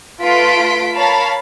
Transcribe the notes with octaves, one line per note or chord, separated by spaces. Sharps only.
A3 F4 B4 C6 B6 D7
A#4 C#5 F5 A5 B5